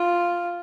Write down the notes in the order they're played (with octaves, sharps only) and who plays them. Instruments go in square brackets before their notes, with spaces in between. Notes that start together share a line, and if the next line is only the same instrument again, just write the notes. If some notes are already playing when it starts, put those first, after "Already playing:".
Already playing: [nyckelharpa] F4